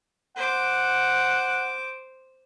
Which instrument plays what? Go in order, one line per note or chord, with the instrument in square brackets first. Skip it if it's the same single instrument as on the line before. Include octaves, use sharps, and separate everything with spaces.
[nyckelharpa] C5 D6 [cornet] F#5